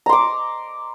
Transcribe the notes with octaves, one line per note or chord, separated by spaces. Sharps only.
A#5 C6 D6